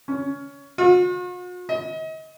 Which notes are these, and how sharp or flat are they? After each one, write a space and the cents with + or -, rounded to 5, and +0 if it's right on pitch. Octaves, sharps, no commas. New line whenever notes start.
C#4 +20
F#4 -45
D#5 +35